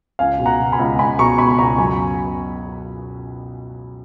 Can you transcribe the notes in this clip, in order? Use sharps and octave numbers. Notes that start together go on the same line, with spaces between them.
C#2 F5 G#5
B2
F#5 A#5
B2
G#5 B5
C#2
C#2 G#5 B5
B2 A#5 C#6
B2 G#5 B5
C#2 A#5 C#6
F#2 G#5 B5